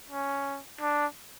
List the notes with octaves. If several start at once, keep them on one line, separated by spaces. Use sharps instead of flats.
C#4
D4